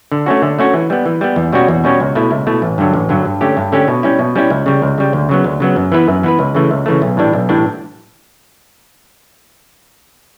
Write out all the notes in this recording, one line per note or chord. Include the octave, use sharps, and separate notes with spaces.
D3
A3 C#4 F#4
D3
A3 C#4 F#4
E3
G3 B3
E3
G3 B3
E2
B2 G3 C#4 F#4
E2
B2 G3 C#4 F#4
C#2
B2 A3 E4
C#2
B2 A3 E4
A1
G2 D3 F#3
A1
G2 D3 F#3
G2
D3 A3 C#4 G4
G2
D3 A3 C#4 G4
B2
G3 C#4 E4
B2
G3 C#4 E4
C#2
C#3 G3
C#2
C#3 G3
D2
C#3 F#3 B3
D2
C#3 F#3 B3
F#2
E3 B3 E4 B4
F#2
E3 B3 E4 B4
C#2
C#3 E3 A3
C#2
C#3 E3 A3
B1
A2 E3 G3 D4
B1
A2 E3 G3 D4